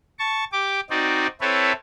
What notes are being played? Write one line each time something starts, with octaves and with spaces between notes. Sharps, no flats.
A5 C#6
G4 D6
C4 D#4 F#4 D5
C4 E4 A4 B4 C#5